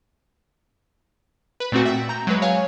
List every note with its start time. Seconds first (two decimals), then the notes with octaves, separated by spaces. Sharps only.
1.60 B4
1.72 A#2 A3 C4 F#4
1.86 E5 G5
2.09 A#5 G6
2.27 F#3 G#3 B4
2.42 C#5 F5 G#5